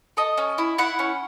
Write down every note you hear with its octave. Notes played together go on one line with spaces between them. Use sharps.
A4 D#5
C#4
E4
E4 F#5
C#4